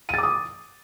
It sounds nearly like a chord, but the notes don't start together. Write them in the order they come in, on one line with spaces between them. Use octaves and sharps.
D#7 A6 D6 D#6